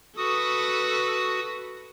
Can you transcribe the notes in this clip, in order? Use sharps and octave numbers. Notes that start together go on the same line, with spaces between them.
F#4 A4 B4 D#6